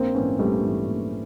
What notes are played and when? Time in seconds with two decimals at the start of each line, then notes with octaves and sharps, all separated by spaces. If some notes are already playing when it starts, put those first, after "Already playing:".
Already playing: A#1 A#3 C4
0.15 G#2 E3 B3 C#4
0.39 A#1 G3 A3
0.63 G#2 E3
0.87 A#1